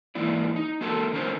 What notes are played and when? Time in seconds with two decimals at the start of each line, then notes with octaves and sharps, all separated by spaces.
0.15 G#2 E3 A#3 E4 D5
0.56 D#4
0.81 A#3 F#4 A4 A#4 A5
1.12 D3 D#3 C#4 A#4 C5